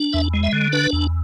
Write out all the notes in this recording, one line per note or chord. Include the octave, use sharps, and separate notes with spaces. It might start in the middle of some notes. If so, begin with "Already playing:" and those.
Already playing: D4
E2 E5
G#3
E5
D3
D4 B4
E2